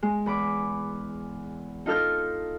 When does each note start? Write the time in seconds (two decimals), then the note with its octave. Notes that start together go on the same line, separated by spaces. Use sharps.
0.03 G#3
0.26 E2 B5 D6
1.86 D#4 F4 A4 F6 G6